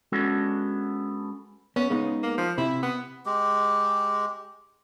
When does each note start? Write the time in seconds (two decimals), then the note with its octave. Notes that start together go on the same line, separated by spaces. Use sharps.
0.12 G#3 B3 C#4 D4 F#4 A4
1.76 B3 C#4
1.90 C#3 G#3 B3 D#4
2.23 A#3
2.38 F3
2.58 C3 E4
2.82 B3
3.26 G#3 G4